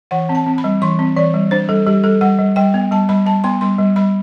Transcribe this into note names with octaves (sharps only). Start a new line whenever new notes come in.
E3 F#5
C4
A5
C4
B5
G3
E3 C6
C4
E3 D5
G3
D4 C5
G3 A4
G3 G4
G3 A4
G3 F#5
G3
G3 G5
B3
G3 A5
G3 B5
G3 A5
B3 C6
G3 C6
G3
G3 B5